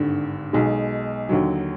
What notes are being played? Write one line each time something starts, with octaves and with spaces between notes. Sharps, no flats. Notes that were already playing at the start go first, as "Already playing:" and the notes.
Already playing: G#1 G2 D3
B1 B2 G#3
D#2 D3 F#3